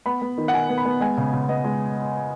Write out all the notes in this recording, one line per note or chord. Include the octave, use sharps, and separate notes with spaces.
B3 B5
B3
D#3
F#5
D#3 G#5
B3
B5
B3
G#3 G#5
C#3
C#3
B3 D#5
G#3